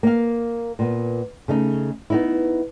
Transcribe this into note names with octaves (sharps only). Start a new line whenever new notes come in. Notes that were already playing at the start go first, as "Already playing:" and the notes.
A#3 F5
A#2 B3
C#3 A3 D#4
B3 D#4 E4